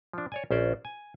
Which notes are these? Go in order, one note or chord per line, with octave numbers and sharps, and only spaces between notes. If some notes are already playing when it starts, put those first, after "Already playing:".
F3 D4
C#5 D5 G#5
A#1 C#4 C5 D5
G#5